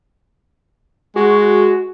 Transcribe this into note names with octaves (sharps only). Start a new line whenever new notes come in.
G#3 F#4